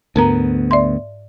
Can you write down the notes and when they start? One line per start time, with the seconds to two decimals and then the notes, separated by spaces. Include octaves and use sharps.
0.16 D2 G#2 B3 A#4 A#5
0.71 D5 E5 C6